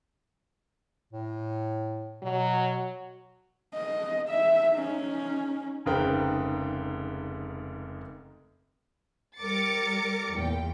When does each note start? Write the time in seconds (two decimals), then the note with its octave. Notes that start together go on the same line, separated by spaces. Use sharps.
1.13 A2
2.22 B2 F#3
3.74 D#5
4.29 E5
4.75 C#4 D#4
5.86 F1 G#2 C#3 A#4 B4 G5
9.39 G3 A#4 D6 A6 C#7
10.34 E2 A#2 G5